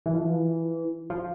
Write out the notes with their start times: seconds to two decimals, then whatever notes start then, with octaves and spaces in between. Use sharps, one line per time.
0.06 E3
0.15 F3
0.24 E3
1.10 F3